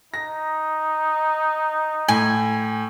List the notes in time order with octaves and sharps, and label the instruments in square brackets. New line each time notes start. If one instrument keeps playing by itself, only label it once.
[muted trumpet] D#4 [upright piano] A#6
[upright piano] A2 [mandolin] G#5